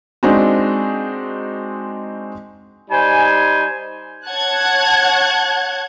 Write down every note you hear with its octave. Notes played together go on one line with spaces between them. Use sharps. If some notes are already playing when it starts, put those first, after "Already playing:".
G#3 C4 D4 D#4 F#4
G3 D#4 C5 G#5
C#5 F#5 A5 F#6 G#6